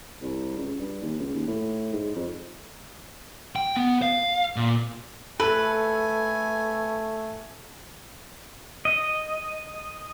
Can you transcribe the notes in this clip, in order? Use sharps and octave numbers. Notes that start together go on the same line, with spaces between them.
C2
C#2
G2
D#2
C#2
D#2
A2
G#2
F2
G5
B3
F5
A#2
A3 A4 B4 G#5
D#5